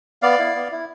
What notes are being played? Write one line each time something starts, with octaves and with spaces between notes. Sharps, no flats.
B3 D5 F5
E4
B3
E4